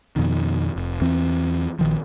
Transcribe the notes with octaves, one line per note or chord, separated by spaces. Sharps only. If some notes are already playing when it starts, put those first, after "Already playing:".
F2 B2 D#3
F1
E2 E3 C4
A#1 D#3 F3